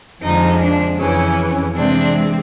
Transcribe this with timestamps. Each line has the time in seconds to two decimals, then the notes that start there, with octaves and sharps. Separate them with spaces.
0.21 F2 D3 F3 G#3 D#4
0.59 D4
0.98 F2 C#3 E3 C#4
1.75 C3 E3 G#3 C4 D4